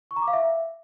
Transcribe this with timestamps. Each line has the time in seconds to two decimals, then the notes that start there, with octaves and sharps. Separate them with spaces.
0.11 C#6
0.16 A#5
0.22 D6
0.28 F5
0.33 E5